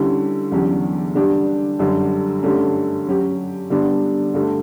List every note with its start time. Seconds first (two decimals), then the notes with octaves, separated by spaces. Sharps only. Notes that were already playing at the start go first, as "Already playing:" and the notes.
Already playing: D3 G3 C#4 E4 G4
0.51 E2 D3 F#3 C#4 G4
1.15 D3 G3 D4 G4
1.79 F#2 D3 G3
2.43 G2 D3 A3 C#4
3.07 F#3 C#4 G4
3.70 D3 G3 B3 D4
4.34 G2 D3 A3